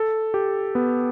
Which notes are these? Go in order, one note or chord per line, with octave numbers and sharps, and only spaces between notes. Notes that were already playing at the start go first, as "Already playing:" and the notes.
Already playing: A4
G4
B3